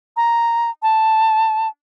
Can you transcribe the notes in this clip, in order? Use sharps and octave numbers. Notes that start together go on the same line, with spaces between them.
A#5
A5